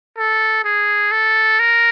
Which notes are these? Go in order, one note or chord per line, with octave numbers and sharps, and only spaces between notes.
A4
G#4
A4
A#4